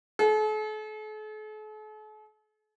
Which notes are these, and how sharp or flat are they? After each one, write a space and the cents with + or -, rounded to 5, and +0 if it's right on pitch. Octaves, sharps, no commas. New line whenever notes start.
A4 -45